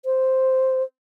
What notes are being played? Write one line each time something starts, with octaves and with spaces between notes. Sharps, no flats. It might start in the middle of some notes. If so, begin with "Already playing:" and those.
C5